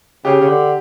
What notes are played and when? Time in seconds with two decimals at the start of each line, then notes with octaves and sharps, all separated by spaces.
0.25 C#3 G4
0.40 C#3
0.48 D3